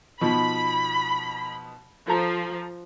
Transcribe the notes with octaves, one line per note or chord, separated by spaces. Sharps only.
B2 F3 D#4 B5
F3 A4 A#5